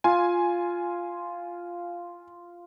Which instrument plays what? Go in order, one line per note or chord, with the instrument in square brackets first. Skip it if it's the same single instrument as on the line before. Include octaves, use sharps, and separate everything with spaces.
[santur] F4 [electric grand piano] G#5